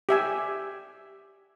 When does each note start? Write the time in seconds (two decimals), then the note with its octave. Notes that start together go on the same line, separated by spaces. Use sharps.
0.09 G4 E5 G#5